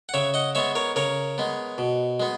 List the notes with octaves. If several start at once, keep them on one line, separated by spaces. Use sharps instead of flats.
F#5
C#3 C#5 E5
D#5 F#5
G#3 B3 C#5 E5
A#4 C#5
C#3 A#4 C#5
G#3 B3
B2
G#3 B3